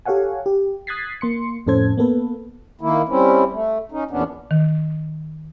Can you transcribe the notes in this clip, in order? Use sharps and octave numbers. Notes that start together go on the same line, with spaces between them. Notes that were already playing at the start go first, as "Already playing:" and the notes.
G4 A4 C#5 F5 F#5 G#5
G4
D#6 F#6 G#6 A6 B6 C7
A#3 C6 C#7
F2 A2 C#4 A4 C5 G#6
A#3 B3 A4 B4
D#3 A#3 E4
G3 C4 C#4 E4
A3
C#4 D#4
E2 A#2 B3 C#4 D4
D#3